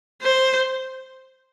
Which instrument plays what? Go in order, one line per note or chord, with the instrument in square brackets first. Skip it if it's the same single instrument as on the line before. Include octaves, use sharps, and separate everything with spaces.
[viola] C5